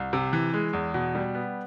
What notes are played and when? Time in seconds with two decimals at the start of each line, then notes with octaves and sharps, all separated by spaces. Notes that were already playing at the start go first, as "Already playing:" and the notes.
Already playing: C2
0.13 C3
0.33 E3
0.53 G#3
0.73 E2
0.94 B2
1.15 G3
1.35 B3